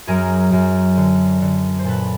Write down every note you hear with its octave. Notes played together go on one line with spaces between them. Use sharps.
F#2 G#4 A#4
F#2
D3
D3
C5
A#2 A4 B4